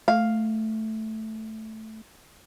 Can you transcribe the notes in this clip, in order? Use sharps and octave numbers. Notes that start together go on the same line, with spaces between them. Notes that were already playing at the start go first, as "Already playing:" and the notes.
A3 F5